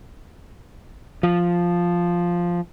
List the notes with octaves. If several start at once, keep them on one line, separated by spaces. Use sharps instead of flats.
F3